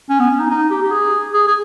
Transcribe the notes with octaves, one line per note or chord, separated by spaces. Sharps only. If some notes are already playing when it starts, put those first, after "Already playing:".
C#4
B3
C#4
D#4
D#4
G4
G4
G#4
G#4
G#4